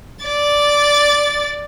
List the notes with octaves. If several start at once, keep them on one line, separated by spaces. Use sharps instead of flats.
D5 A6